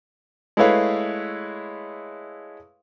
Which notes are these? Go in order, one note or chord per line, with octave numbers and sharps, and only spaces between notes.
G#3 A3 E4 B4 C#5 F5